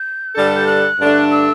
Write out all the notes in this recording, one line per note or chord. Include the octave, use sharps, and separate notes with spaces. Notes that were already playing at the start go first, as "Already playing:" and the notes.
Already playing: G6
G2 D3 G3 D4 A4
G6
F#6
G2 D3 A3 D4 A4
E6